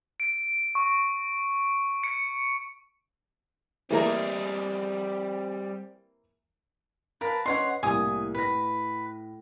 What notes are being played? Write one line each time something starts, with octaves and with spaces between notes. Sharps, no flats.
D7
C#6
C#7
E3 G3 A#3 C4 G#4 A#5
A#4 B4 F5 A5
C#4 B4 C#5 D#5 F#5 C6
C2 A2 A#3 G#5 D#6
A2 B4 A#6